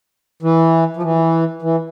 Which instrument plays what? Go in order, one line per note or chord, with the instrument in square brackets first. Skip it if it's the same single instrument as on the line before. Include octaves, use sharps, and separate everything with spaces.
[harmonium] E3
F3
E3
E3